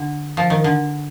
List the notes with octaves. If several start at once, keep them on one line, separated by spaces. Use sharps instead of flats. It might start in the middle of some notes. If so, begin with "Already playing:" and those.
Already playing: D3
F3
D#3
D3